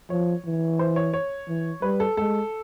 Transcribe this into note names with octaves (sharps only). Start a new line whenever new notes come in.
F3 C#5
E3
C5
C#5
C#5
E3
G3 B4
A4
G#3 A4